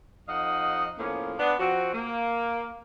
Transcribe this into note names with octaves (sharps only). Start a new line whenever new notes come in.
F2 D#4 D#5 F5 F#5
A2 F3 A#3 B3 C#4
B3 D4
F3 C4 F#4
A#3